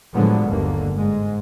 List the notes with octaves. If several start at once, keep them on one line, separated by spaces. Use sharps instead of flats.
A2 D3 F3 F#3 G#3 B3
G1 D#2 D3 A#3
G#2 G#3